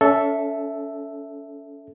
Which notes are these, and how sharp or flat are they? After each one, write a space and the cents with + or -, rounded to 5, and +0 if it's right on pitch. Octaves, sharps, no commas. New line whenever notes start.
C#4 +35 A4 +0 E5 +0